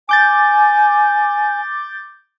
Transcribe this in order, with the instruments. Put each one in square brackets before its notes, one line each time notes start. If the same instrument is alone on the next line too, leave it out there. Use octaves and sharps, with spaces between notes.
[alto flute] G#5 [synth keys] D6 G6 A6